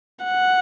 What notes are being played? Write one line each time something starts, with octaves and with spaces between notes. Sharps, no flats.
F#5